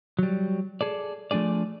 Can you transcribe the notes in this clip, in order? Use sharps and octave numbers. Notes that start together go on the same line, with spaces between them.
F#3 G3
G#4 A4 D5
F3 A3 D4 G#4 D5